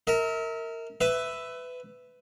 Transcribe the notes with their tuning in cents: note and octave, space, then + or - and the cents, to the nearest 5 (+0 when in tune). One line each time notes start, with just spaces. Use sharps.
A#4 -20 E5 -40
B4 +20 E5 +0